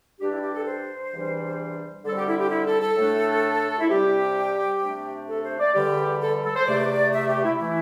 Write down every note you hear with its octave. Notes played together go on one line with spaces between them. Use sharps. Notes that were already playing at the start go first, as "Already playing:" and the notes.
G2 G3 D4 G4
E4
G4
A4
C5
E2 C3 E3 G3 D4
D3 G3 C4 A4
G4
E4
G4
E4
A4
A4
A2 A3 D4
E4
C3 G3 D4 G4
C3 A3 D4
A4
C5
D5
E2 D3 G3 G4
A4
A4
C5
E2 C3 A3 D5
E5
G4
E4
E3 A3 E4